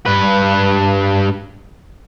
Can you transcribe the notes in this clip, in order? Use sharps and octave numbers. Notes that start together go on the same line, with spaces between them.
G2 B4